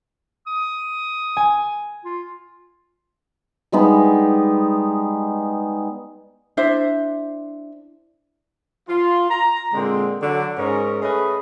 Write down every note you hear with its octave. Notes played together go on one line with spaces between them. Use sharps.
D#6
G#5
F4
G3 G#3 B3 D#4
D4 E4 C5 E5
F4
A#5
A#2 D3 G#3 C4
D3 F#3
G#2 C#4 A#4
A3 C#4 G#4 B4 D#5